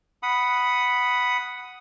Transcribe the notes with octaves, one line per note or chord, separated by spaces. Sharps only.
F#5 B5 D#6